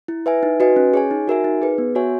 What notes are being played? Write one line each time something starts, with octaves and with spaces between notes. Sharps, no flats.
E4
B4 E5 G#5
D#4
F#4 B4 D#5 G#5
C#4
G#4 C#5 G#5
D#4
F#4 A#4 E5 G#5
D#4
G#4 B4
B3
F#4 C#5 E5 G#5